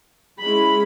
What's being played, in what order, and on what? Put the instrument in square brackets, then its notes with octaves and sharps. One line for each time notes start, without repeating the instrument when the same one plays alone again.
[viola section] G#3 C#4 E4 B5